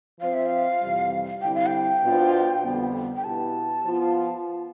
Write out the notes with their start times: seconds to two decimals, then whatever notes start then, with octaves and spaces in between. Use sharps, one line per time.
0.21 F3 C4 F4 C5 F5
0.34 E5
0.46 F5
0.82 F2 C3 E3 G3
1.42 D3 G3 C4 E4 G5
1.55 F5
1.66 G5
2.03 B2 B3 D4 F4 C5
2.64 F2 D3 G3 B3
3.16 G5
3.24 B2 B3 E4 G4 B4 A5
3.85 F3 B3 F4